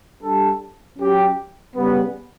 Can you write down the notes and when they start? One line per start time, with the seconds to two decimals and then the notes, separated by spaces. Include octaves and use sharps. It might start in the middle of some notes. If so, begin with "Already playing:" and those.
0.22 G3 D4 A4
0.99 F#3 C#4 G4
1.75 C#3 G3 B3